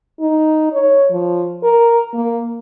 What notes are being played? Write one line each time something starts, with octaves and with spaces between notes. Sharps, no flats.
D#4
C#5
F3
A#4
A#3